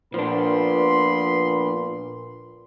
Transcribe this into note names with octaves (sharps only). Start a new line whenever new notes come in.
A#2 F3 B3 D4 B5 C6